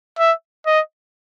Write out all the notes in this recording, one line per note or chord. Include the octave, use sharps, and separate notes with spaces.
E5
D#5